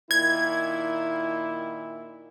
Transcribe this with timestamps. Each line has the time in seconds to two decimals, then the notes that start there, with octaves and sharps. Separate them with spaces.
0.11 A#2 D#3 E4 G#6